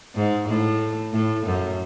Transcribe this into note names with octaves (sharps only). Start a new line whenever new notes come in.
G#2
A2
A2
F#2